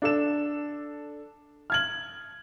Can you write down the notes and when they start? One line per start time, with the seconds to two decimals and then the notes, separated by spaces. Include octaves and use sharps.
0.02 D4 A4 E7
1.70 F6 G#6 F#7